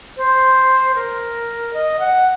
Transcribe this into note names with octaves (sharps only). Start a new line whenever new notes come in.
C5
A#4
D#5
F#5